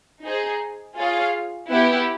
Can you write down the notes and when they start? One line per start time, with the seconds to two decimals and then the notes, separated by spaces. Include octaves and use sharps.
0.23 D#4 G#4 C5
0.98 F4 G#4 C#5 F5
1.71 B3 E4 G4